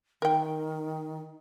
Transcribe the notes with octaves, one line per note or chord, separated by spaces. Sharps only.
D#3 A#4 G5